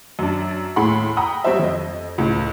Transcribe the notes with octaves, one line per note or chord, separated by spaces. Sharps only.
F#2 D4
D#2 A2 G#4 F#5 B5 C6
F#5 G5 A#5 B5 D#6
F#3 G3 C4 F#4 C5 E5
F2 D#5
C#2 A2